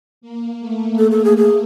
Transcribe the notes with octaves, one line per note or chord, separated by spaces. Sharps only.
A#3
A3
A4
A4
G#4
G#4